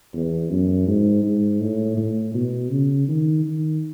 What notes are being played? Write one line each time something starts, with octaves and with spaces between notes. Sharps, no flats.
E2
F#2
G#2
G#2
A2
A2
B2
C#3
D#3
D#3